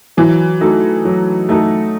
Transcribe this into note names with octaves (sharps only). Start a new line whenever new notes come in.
E3 F#3
A3 D#4 F#4 A4
F#3
A3 D#4 F#4 A4